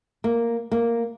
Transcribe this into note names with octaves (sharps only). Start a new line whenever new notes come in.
A#3
A#3